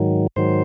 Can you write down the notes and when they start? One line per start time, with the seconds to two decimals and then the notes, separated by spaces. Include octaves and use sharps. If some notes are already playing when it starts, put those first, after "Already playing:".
Already playing: G#2 D#3 F#3
0.36 G#2 D#3 F#3 C5